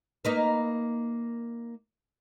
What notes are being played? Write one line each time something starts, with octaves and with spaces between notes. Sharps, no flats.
A#3 D#4 B4